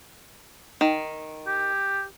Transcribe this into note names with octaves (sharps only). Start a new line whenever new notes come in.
D#3
G4